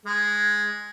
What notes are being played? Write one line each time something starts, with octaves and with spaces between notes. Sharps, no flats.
G#3